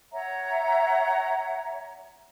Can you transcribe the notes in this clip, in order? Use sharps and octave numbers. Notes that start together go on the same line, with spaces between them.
C#5 E5 F#5 A#5